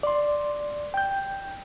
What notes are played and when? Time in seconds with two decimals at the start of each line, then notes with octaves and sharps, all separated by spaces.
0.03 D5 C6
0.94 G5 G6